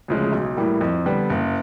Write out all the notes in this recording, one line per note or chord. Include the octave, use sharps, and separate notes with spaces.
D2 C#3 F3 G#3
B1
A2 E3 G3 A#3
F2
D3 G3 B3
F#1